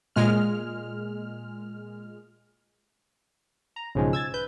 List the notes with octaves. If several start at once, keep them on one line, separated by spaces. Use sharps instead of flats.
A#2 G#3 F6
A#5
B1 G#2 C#3 F3 G#3
E6 G#6 A6
B4 G6